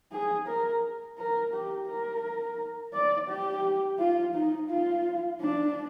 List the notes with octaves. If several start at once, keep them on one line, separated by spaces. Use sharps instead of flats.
G#4
A#4
A#4
G4
A#4
D5
G4
F4
D#4
F4
D4